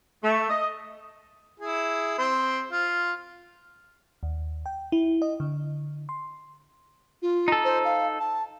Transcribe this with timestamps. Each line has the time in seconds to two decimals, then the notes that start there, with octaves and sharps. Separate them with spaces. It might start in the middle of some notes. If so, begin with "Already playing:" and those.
0.24 A3
0.50 D#5
1.60 E4 G#4
2.18 C4 C6
2.71 F4
4.23 D#2
4.66 G5
4.92 E4
5.22 D#5
5.40 D3
6.09 C6
7.22 F4
7.48 D#4 A4
7.65 C5
7.85 F5
8.20 A5